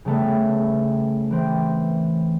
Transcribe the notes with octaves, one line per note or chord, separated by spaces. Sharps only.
C#3 G3 A3 B3
E3 C4